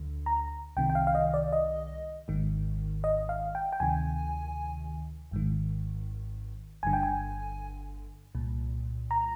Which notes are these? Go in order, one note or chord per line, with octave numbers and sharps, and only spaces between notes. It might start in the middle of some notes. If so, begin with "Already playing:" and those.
Already playing: D2 D3
A#5
C2 C3 D#3 G5
G5
F5
F5
D#5
D5
D#5
G#1 G#2 D#3
D#5
F5
G5
G5
D2 C3 D#3 G#5
G#1 G#2 D#3
G1 G2 D3 G#5
G5
G#5
C2 A#2
A#5